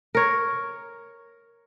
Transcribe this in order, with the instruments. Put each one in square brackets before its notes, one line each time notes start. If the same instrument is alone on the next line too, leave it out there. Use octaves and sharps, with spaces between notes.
[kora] A#4 C#5